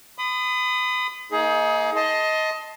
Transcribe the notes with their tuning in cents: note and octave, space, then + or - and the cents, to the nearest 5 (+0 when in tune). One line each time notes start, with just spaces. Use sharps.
B5 +35 D#6 -15
A#3 +0 D#4 +30 G#4 +20
D#5 +20 A5 +5 C6 +0